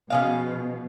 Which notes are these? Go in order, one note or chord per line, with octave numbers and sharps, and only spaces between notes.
B2 F3 C#4 G#4 F5